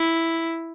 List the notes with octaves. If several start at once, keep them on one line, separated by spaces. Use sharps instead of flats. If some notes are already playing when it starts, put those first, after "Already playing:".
Already playing: E4